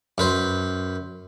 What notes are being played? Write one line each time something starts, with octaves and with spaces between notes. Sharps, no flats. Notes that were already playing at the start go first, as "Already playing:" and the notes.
F#2 B4 C5